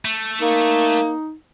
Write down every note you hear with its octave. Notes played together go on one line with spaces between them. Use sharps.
A3
A#3 D#4